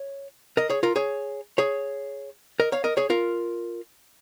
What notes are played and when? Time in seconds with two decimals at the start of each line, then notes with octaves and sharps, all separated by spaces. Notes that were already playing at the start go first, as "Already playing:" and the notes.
Already playing: C#5
0.57 A#4 D#5
0.70 G#4 C#5
0.83 F4 A#4
0.96 G#4 C#5
1.58 G#4 C#5
2.60 A#4 D#5
2.72 C#5 F5
2.84 A#4 D#5
2.97 G#4 C#5
3.10 F4 A#4